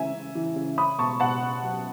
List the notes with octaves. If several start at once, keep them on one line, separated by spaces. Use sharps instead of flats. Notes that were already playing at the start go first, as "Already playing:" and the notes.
Already playing: C#3 E3 E5 G#5
C#3
E3
C#3
C#4 B5 D#6
B2 A5 C#6
B2 F#5 A5
C#4
F#3